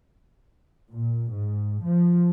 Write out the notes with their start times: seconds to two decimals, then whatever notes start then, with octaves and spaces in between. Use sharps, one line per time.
0.92 A#2
1.34 G#2
1.85 F3